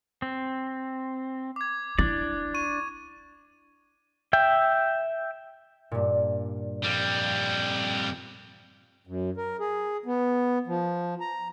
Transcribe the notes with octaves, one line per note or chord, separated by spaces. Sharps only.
C4
D6 G#6
D4 E4 D5
C#6 D#7
E5 G5
G2 A#2
F2 G3
F#2
A#4
G#4
B3
F3
A#5